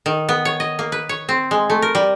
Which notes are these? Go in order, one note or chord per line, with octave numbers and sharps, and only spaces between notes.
D#3
B3
C#5
D#5
A#3
B4
C#5
C4
G#3
A3
A#4
G3